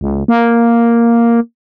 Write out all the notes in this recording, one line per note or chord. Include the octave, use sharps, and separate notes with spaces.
C#2
A#3